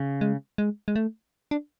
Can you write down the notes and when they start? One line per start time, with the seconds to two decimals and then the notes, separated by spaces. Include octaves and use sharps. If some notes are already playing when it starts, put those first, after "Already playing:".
Already playing: C#3
0.21 G#3
0.58 G#3
0.88 G#3
0.96 A3
1.51 D4